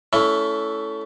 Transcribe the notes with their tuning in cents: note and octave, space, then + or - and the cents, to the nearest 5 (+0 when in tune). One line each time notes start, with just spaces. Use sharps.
A3 +0 C#4 +25 E4 +0